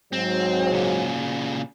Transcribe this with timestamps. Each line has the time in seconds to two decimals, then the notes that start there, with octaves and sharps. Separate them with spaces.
0.13 G#2 F#3 C4
0.72 A#2 C#3